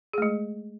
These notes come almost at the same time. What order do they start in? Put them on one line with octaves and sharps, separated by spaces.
G#4 A3 G#3